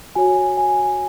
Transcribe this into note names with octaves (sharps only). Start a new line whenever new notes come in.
F#4 C#5 G#5
G#5